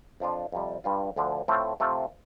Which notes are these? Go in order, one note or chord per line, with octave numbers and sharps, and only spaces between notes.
F2 F3 D4 F4
F2 C3 G3
G2 G3 F4
D2 D3 F3 D4
A2 A3 C4 F4
C3 A3 C4 F4